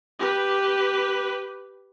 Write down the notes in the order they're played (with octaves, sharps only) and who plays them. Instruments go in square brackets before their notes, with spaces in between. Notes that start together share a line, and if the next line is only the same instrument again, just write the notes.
[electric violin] G4 B4